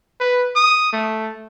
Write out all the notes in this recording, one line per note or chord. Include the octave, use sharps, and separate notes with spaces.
B4
D#6
A3